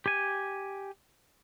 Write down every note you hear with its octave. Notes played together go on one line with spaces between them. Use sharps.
G4 G#5